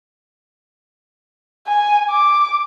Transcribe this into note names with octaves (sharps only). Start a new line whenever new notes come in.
G#5
D6